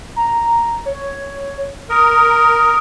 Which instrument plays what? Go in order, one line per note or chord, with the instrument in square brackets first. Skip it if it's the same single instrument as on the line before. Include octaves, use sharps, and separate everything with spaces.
[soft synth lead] A#5
C#5
[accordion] A#4 [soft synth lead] D#6